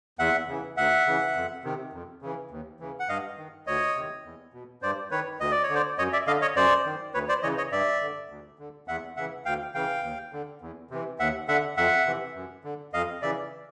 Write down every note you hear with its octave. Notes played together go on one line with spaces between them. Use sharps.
E2 E5 F#5
C#3 E3
D2 E5 F#5
C#3 E3
F2
C3 D#3
F2
C#3 E3
D#2
C#3 E3
F#5
G2 D#5 F5
D#3
D2 C#5 D#5
C3 D#3
E2
B2
G2 C5 D5
D#3 B4 C#5
D2 D#5
D5
C#5
D3
C5 D5
F#2 C#5 D#5
D5 E5
D3 D#5 F5
C#5 D#5
F#2 C5 D5
D#3
D2 B4 C#5
C5 D5
C#3 E3 C#5 D#5
C#5 D#5
G2 D5 E5
D3
D2
D3
E2 E5 F#5
C#3 E3 E5 F#5
D2 F5 G5
C#3 E3 F5 G5
D#2
D3
E2
C3 E3
D#2 E5 F#5
D3 E5 F#5
F2 E5 F#5
C3 E3
F#2
D3
F2 D#5 F5
C#3 E3 D5 E5